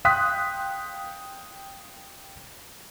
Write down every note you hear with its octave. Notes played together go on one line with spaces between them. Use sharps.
F5 G5 C6 D#6 F#6 B6